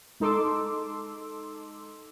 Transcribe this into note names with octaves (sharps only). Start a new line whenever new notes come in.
G#3 D#4 A4 C6 D6 E6